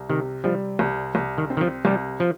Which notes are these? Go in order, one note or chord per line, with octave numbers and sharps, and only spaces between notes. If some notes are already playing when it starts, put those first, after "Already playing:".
Already playing: C2
C3 D#3
F3 G3
C2
C2
D#3
C4
D#3
F3
C2 G3
F3